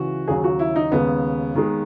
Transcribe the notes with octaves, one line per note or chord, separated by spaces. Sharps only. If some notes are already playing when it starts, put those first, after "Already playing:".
Already playing: C#2 C#3 E3 F#4
D#2 C#3 F#3 G#4
F#4
E4
D#4
D#2 C#3 G#3 B3
D#2 D#3 G#3